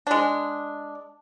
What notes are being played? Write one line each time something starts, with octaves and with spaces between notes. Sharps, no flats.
G#3 D4